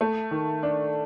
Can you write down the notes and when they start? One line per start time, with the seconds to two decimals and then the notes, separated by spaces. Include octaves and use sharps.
0.01 A3
0.31 D#3
0.63 D4